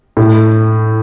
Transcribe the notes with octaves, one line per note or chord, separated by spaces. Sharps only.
A2